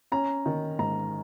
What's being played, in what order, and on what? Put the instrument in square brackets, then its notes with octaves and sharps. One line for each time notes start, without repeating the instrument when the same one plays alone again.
[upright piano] C#4 A#5
D#3
G#2 A#5